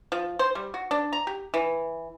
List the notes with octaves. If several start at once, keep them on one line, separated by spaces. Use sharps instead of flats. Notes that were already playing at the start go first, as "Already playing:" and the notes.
F3
C5
G3
F#4
D4
A#5
G4
E3